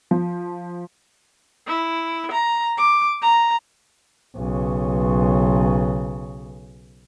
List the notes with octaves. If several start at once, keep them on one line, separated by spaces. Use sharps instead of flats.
F3
E4
A#5
D6
A#5
B1 C#3